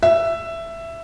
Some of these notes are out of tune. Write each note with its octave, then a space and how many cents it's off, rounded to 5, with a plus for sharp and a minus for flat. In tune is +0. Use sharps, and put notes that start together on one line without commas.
E5 +10